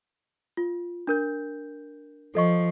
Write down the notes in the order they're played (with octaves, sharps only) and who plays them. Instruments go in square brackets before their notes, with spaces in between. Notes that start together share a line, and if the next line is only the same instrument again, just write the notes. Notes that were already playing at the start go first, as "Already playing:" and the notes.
[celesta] F4
D4 A#4 G6
[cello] F3 [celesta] A4 D#5 C#6